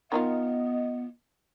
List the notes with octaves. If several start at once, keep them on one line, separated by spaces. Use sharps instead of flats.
D#3 B3 D#4 F4 D#5